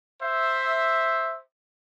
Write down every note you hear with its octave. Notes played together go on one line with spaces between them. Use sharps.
C5 E5